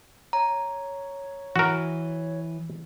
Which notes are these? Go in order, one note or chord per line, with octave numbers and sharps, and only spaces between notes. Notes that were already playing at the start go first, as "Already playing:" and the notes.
C#5 A#5
E3 F#4 A#4